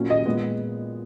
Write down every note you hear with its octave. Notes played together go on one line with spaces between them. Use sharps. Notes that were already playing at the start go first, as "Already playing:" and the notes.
Already playing: A#2 F#3 C#4
D#5
A#2 G#3 B3